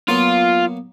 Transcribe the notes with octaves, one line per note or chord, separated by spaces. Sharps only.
F#3 A#3 B3 F4